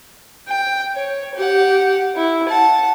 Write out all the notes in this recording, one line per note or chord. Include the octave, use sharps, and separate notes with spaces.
G5
C#5
G4 F#5
E4
F#5 A5